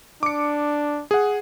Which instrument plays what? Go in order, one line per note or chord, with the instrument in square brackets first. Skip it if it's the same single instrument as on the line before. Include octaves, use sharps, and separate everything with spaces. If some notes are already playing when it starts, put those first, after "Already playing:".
[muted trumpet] D4 [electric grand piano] D6 C#7
[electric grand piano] G#4 F#5